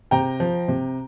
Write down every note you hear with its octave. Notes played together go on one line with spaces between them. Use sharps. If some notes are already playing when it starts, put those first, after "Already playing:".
C3 G5 A#5
F3
C3